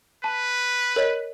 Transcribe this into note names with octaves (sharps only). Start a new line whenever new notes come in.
B4 A5
A#4 C#5 D#5